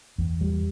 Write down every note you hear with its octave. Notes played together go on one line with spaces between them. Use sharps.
E2
G3